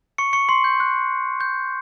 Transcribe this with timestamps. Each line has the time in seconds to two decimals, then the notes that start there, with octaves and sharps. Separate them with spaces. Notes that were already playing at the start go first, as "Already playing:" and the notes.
0.18 C#6 C#7
0.33 C#6 C#7
0.49 C6 C7
0.64 G6
0.80 F#6
1.41 G6